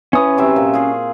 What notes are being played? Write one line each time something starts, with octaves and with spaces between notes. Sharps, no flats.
E3 C#4 C#6 D#6
C3 F#3 E5
A#2
F4 G#4